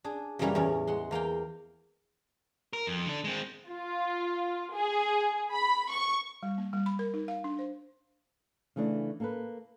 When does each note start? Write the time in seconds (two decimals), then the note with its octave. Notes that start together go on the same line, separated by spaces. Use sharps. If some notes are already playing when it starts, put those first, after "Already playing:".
0.04 D4 G#4
0.39 F#2 C#3 E3 G3 A#3 C#4
0.55 E2 A2 C#4 D5
0.87 G#3 F#5 C6
1.11 E2 A#3 F5 G5
2.73 A#4
2.87 F2
3.06 D3 D4
3.24 G#3 C4
3.69 F4
4.73 G#4
5.52 B5
5.89 C#6
6.43 G3
6.58 A#3
6.73 G3
6.86 B5
6.99 A#4
7.14 D#4
7.28 F5
7.44 D4
7.59 C5
8.76 C#3 E3 A3 D4
9.20 A#3 A4 B4